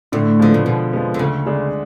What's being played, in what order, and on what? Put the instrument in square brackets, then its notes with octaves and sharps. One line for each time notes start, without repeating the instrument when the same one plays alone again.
[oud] A2 [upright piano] D3
[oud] D3 [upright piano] F3 G#3 B3
[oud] C#3
[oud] B2 [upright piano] D3
[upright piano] F3 G#3 B3
[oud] D3
[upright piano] D2 [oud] C#3
[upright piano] D3 G#3 D4 G#4